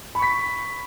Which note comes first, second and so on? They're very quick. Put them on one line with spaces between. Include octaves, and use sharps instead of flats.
B5 C#6 B6